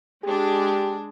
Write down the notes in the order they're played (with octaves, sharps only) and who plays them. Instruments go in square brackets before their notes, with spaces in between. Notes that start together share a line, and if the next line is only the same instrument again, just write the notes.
[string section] G#3 D4 [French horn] G4